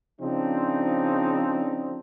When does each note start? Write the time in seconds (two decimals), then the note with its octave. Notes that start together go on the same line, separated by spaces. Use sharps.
0.20 C#3 F3 C4 D4 D#4